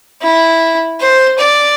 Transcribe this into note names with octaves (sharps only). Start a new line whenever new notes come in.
E4
C5
D5